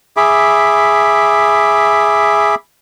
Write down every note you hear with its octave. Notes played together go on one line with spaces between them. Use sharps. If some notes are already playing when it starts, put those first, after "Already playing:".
G#4 E5 B5 D6